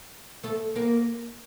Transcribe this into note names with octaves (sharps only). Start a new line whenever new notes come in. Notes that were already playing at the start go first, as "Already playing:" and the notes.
A3 A4
A#3 A#4